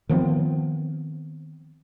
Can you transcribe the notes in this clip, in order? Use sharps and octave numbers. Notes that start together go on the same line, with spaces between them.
D#3 F3 B3 C4